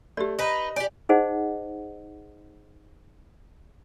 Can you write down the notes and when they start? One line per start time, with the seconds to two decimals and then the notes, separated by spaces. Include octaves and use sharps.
0.17 A3 G4 D5
0.39 D#4 B4 D#5
0.76 G4 D5 G#5
1.09 D#4 G#4 C5 D#5 F#5